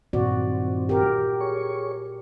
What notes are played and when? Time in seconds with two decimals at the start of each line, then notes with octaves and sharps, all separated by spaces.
0.13 G2 A#2 D#3 C4 F#4 D5
0.89 G4 A#4
1.41 G#4 C#5 C#6